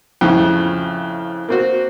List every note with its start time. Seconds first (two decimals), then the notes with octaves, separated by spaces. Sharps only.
0.21 F2 A2 C#3
1.49 A#3 C4 F#4